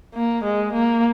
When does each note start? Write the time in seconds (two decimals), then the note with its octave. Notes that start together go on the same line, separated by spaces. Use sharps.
0.14 A#3
0.44 G#3
0.73 A#3